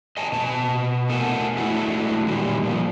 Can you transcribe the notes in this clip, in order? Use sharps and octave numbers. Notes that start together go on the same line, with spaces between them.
D#5 G#5 A5
B2 A5
A3 A4 A#4 F#5 G#5 A5
G#3 A3 D4 E4 F#4 A4
A#2 D3 D#3 G3
A#2 F3